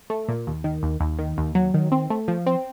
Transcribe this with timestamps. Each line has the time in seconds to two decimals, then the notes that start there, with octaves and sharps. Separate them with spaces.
0.10 A3
0.29 A#2
0.47 D#2
0.64 D#3
0.83 D#2
1.00 D#2
1.19 D#3
1.38 D#2
1.55 F#3
1.74 D#3
1.92 C4
2.10 A3
2.28 F3
2.46 C4